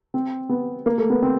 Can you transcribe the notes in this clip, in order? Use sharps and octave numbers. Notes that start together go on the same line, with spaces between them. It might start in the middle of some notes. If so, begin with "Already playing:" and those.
C4
B3
A#3
A3
B3
C4